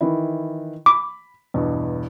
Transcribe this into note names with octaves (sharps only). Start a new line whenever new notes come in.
D#3 E3 E4
B5 D6
E2 G2 B2